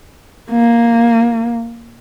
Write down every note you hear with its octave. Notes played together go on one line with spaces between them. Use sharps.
A#3